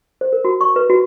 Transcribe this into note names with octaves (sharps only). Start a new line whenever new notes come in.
C5
A#4
F#4
C#6
B4
F#4